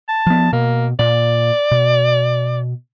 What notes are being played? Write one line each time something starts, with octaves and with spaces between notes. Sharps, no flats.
A5
F3 B3
B2 A#3
A#2 D5
B2